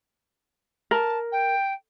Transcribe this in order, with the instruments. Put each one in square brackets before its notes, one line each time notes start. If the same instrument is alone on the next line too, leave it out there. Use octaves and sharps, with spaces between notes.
[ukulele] A#4 [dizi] A5
[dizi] G5